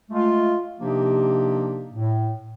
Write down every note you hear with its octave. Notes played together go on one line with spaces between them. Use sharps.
G#3 A3 F4
C3 F3 A#3 D4 D#4 G4
A2